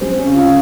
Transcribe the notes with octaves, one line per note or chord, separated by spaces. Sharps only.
G#3 C4
C#4
C#3
F4